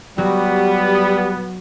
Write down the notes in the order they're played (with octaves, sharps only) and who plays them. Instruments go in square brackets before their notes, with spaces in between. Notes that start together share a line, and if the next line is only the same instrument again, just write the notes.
[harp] F#3 F#4 [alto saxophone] G3 [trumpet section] B3 [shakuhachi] G4